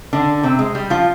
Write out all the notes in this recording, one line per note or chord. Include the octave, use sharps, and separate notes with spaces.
D3 D4
C3 C4
G#3
G3
F3 F4